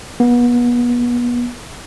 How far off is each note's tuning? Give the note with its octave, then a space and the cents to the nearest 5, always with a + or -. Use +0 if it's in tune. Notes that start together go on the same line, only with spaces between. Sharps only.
B3 -30